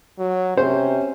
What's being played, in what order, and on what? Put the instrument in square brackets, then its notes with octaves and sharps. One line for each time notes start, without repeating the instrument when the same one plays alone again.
[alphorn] F#3
[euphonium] C3 [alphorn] C#4 [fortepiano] C5